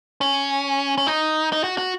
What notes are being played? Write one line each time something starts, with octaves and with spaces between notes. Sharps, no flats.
C#4
C#4
D#4
D#4
F#4
F#4